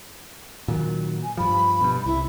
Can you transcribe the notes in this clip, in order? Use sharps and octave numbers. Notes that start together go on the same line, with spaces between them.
A#2 D#3 F#3
G#5
G2 F3 B5
G2 B2
C2 E4